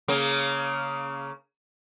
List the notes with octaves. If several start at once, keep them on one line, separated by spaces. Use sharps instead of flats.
C#3 A#3